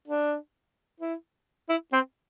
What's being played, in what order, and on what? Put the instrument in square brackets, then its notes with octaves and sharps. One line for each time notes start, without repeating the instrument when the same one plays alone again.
[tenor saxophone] D4
E4
E4
C4